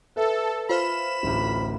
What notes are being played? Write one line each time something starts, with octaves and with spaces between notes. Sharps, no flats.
A4 B4 E5
F4 C5 B5 F6 E7
D1 A1